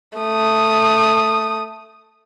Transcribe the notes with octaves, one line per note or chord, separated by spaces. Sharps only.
A3 D#6